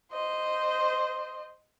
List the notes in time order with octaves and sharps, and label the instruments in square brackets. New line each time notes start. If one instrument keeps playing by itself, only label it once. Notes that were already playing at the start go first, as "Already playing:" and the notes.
[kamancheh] C5 D#5